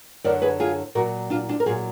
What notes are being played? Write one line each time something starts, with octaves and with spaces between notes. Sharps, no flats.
F#2 D3 F#3 A#4 D5
G#4 B4
F4 G#4
A#2 F#3 F#4 A#4
D4 F4
D4 F4
A#4
A#2 F#3 F4 G#4